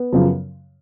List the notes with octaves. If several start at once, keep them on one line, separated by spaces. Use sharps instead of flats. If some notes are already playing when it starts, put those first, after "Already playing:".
Already playing: B3
F#2 C#3 F3